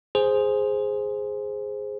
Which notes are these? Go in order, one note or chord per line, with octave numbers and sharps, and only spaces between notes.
G#4 C5